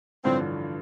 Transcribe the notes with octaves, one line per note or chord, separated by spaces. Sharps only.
A1 G2 D3 F3 C4 D4